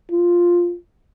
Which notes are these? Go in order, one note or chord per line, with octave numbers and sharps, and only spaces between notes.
F4